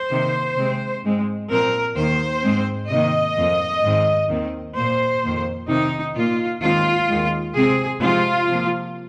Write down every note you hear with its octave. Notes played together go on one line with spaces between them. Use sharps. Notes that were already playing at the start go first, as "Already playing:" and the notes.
Already playing: C5
C3 D#3 A#3
C3 G#3 C4
G#2 G#3 C4
A#2 F3 C4 A#4
D#2 D#3 A#3 C5
G#2 G#3 C4
C3 D#3 A#3 D#5
F2 F3 A#3
G#2 D#3 G#3 C4
D#2 D#3 C4
A#2 A#3 C5
F2 D#3 A#3
C3 D#3 C4 D#4
A#2 A#3 F4
D#2 D#3 G#3 C4 F4
D#2 D#3 G#3
C3 G#3 C4 G#4
C3 F3 G#3 C4 F4
C3 F3 A#3